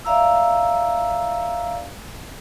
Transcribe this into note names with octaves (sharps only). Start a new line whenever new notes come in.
D5 E5 F5 A#5 E6